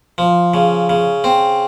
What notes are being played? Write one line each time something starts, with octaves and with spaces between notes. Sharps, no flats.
F3
C#3
C#3
C4